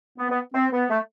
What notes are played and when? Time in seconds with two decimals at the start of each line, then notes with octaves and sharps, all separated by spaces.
0.18 B3
0.30 B3
0.54 C4
0.72 B3
0.90 A3